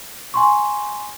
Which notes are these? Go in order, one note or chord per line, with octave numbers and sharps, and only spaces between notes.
G#5 C6 C#6